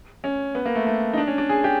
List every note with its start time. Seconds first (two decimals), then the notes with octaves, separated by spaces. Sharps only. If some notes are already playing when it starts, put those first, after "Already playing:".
0.24 C#4
0.55 B3
0.65 A#3
0.76 A3
0.86 A3
1.13 D#4
1.18 D4
1.27 C#4
1.38 D4
1.49 G#4
1.64 G4